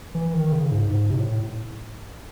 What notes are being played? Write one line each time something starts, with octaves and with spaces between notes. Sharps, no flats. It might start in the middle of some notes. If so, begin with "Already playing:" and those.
E3
D#3
C#3
G#2
G#2
C3
A2